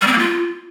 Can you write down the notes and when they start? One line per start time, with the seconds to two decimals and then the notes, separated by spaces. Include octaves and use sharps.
0.02 G3
0.07 C4
0.13 A#3
0.18 F4